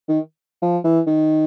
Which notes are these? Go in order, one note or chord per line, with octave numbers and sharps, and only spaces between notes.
D#3
F3
E3
D#3